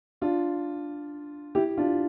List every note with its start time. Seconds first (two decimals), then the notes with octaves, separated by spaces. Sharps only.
0.21 D4 F4
1.55 E4 G4
1.77 D4 F4